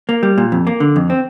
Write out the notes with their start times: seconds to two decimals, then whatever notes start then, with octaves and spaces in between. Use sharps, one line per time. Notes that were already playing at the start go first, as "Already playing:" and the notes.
0.09 A#3
0.23 G3
0.38 A#2
0.52 F2
0.67 A#3
0.80 D3
0.96 F2
1.10 C4